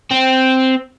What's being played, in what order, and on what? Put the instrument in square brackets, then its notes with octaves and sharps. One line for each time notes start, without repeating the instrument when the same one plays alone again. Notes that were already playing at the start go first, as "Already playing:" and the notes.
[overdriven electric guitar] C4